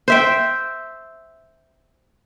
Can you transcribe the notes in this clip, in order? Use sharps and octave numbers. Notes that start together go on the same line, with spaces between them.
C5 E5 G5